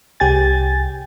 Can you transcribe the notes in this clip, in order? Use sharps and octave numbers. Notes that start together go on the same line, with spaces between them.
C2 G4 G5 G#5 A6